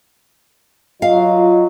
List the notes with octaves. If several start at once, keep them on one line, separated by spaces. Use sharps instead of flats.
F#3 F4 D#5 F5